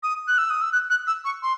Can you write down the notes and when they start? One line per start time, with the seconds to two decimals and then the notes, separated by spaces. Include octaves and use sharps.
0.03 D#6
0.28 F#6
0.38 E6
0.50 D#6
0.61 E6
0.72 F#6
0.90 F#6
1.07 E6
1.25 C#6
1.43 C6